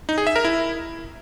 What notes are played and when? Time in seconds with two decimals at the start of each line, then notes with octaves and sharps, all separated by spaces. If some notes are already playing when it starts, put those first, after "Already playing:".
0.09 D#4
0.18 G#4
0.27 E5
0.36 A#4
0.45 E4